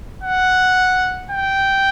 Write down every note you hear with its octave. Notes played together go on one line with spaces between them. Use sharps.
F#5
G5